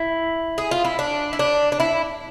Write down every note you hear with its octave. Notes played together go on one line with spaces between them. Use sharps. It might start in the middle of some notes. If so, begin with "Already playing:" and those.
Already playing: E4
G#4
F4
E4
D4
E4
D4
D4
E4